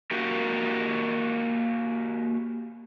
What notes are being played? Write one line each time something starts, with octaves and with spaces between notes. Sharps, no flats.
A#3 F#4 G4 A#4